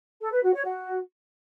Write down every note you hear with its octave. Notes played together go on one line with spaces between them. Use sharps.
A4
B4
F#4
C#5
F#4